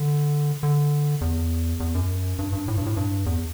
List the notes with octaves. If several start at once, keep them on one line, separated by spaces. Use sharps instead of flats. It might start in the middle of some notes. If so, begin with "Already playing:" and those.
Already playing: D3
D3
E2
E2
F#2
G2
G2
A2
G2
A2
G2
E2